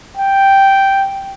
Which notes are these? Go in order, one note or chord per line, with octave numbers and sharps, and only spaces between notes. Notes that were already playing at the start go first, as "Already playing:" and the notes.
G5